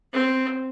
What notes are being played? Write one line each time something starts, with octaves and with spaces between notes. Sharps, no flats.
C4